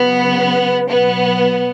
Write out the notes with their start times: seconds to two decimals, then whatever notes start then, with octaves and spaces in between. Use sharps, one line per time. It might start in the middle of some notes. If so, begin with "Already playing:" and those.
Already playing: C#3 F#3 B3
0.87 B2 F#3 B3